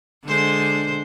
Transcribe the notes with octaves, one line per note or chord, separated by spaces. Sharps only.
D3 G#3 C5